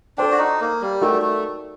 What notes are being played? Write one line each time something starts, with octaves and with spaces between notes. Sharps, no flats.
D4 A4 C5 G5
F#4
D#4
A#3
G3
A3 D#4 F#4 A#4 D5 G5
A3